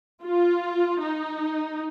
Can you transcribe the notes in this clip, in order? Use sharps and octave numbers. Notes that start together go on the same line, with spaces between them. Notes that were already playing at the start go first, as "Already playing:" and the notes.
F4
D#4